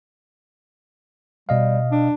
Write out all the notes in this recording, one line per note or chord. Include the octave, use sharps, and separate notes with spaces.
B2 G3 D#5 F5
D4